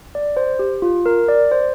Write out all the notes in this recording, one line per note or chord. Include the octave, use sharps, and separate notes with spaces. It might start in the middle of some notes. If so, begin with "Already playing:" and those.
D5
C5
G4
F4
A#4
D5
C5